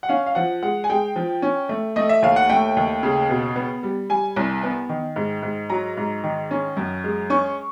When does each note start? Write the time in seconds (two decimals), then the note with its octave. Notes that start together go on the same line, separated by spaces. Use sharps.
0.03 F#5
0.09 C#4 F5
0.26 F5
0.35 F3 F#5
0.62 G#3 F#5
0.84 G#5
0.90 G#3 G5
1.16 F3
1.42 C#4
1.69 A3
1.96 A3 D#5
2.09 E5
2.22 D#2 F5
2.36 F#5
2.49 A3 G5
2.77 D#2
3.03 C#3
3.29 B2
3.56 B3
3.83 G3
4.09 G3 G#5
4.36 C2
4.63 B3
4.89 D#3
5.16 G#2
5.43 G#2
5.70 F#3 A#5
5.97 G#2
6.24 D#3
6.51 C#4
6.77 F#2
7.04 G#3
7.30 C#4 C#6